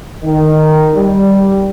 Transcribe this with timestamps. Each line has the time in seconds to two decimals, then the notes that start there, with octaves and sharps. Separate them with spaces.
0.24 D#3
0.95 G3